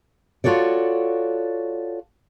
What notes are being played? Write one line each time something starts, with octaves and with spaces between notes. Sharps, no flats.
F4 F#4 A4 C#5 D5